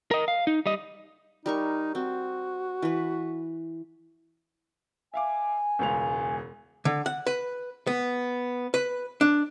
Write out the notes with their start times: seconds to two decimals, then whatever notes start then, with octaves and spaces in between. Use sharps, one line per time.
0.11 A#4 D#5
0.28 F5
0.47 D#4
0.66 G3 D#5
1.46 G3 D#4 A#4 C#6
1.95 C4 F#4
2.82 E3 B4
5.14 E5 F5 G#5 D6
5.79 E1 C#2 F7
6.85 D3
7.06 F#5
7.27 B4
7.87 B3
8.74 B4
9.21 D4